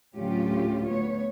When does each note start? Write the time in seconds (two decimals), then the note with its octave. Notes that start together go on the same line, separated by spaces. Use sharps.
0.15 D2 A2 F#3 C#4 F4 G4
0.86 D2 B3 C#5